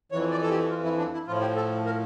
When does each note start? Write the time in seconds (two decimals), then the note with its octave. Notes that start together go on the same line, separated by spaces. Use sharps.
0.12 F2 E3 C#5
0.31 D5
0.42 A4
0.50 G4
0.69 F4
0.84 E4
0.98 D4
1.13 E4
1.27 A2 F3 F4
1.41 G4
1.56 A4
1.86 A#4